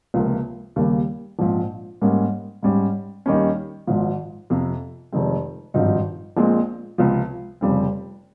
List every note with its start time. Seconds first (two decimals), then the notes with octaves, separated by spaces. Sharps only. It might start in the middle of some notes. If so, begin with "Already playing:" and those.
0.14 C#2 C3 F3 A#3
0.76 D#2 C#3 G3 A#3
1.39 A#1 G#2 F3 C4
2.02 G#2 G3 A#3 C#4
2.63 G#2 G3 C#4
3.26 D#2 D#3 G3 C#4
3.87 G#1 G#2 F3
4.50 F2 C3 F3
5.12 F1 F2 D#3 G#3 C4
5.74 G#1 G2 F3 C4 D#4
6.37 A#1 A#2 G#3 C4
6.98 C#2 C3 F3
7.61 F1 F2 C#3 G3 C4